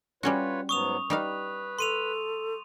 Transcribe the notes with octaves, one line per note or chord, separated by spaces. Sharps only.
G3 C#4 F4 F#4 B4 C#5
G#2 F#3 B3 C#6 D#6 F7
G3 D#4 B4 F5
A4 C6 D#7 F7